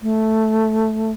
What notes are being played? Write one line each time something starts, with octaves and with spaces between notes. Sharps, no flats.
A3